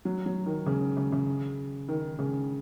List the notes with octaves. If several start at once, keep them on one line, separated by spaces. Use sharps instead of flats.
F#3
F#3
D#3
C#3
C#3
C#3
D#3
C#3